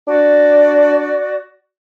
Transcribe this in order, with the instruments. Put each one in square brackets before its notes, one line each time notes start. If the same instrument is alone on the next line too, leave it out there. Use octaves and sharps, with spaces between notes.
[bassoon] D4 [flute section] F#4 D5